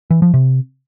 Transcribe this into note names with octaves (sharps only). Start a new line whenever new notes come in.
E3
F3
C3